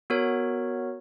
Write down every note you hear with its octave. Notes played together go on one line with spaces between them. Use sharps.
B3 F#4 A#4 C#5